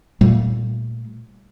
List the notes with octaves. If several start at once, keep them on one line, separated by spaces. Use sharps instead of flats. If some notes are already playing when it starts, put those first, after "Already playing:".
A#2 G3 A3